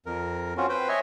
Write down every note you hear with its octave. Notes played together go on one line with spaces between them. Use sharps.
F2 A#4
C4 C#4 F4 F#4
B4 C5 G5
C#5 D#5 E5 G#5